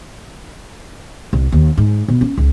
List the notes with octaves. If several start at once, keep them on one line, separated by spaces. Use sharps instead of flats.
C2
D#2
G#2
B2
C#4
C#2